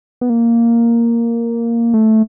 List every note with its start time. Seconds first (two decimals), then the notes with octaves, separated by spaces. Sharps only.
0.21 B3
0.30 A#3
1.94 A3